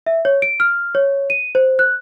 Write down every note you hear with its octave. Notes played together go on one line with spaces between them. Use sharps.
E5
C#5
D7
F6
C#5
D#7
C5
F#6